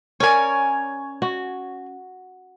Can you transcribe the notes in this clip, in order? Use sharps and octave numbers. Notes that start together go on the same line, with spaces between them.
C#4 A#4 C#5 D5 G#5
F#4